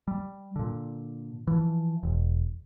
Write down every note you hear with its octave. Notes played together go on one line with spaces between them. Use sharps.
G3
A#2 D3
E3 F3
E1